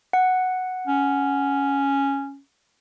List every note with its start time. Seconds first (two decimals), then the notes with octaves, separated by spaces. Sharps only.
0.13 F#5
0.87 C#4